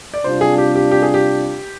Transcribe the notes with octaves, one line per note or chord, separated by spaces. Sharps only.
D5
C3 G3 D4 F4 C5
G#4
G4
G4
G4
G#4
G4